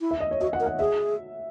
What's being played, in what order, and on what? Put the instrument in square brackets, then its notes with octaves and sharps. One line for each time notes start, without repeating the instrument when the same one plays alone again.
[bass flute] E4
[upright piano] E5
D#5
C#5
[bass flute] F#4 [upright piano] D#5
[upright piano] F#5
[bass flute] A#4
[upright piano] F#5
[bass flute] G#4 [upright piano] E5